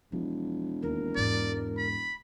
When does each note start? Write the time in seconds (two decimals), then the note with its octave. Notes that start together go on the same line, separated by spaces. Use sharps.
0.12 E1 F3
0.82 D#2 A#4
1.16 E2 G#2 D5
1.77 B5